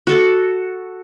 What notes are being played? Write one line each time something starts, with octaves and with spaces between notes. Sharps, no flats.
F#4 A4